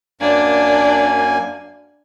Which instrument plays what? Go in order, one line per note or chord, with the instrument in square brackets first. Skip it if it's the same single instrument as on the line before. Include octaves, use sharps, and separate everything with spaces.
[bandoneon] F#2 A#3 G#5 [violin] D4